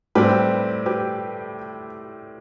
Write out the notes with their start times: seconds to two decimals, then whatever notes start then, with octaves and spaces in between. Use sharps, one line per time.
0.15 A2 G3 C4 G4 B4
0.86 G4 B4